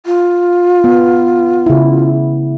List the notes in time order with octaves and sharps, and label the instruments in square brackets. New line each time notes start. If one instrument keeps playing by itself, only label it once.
[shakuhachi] F4
[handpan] B3
C#3 E4